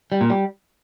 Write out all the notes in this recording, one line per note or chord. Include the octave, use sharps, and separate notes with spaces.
G3
A#2
G3